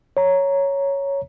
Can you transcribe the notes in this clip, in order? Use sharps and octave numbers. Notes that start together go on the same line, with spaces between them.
C#5 A#5